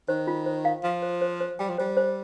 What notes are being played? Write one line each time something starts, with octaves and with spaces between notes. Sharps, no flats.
D#3 C5
F4
C5
F5
F3 F5
C5
C5
C5
G3 G5
F3
G3 C5
C5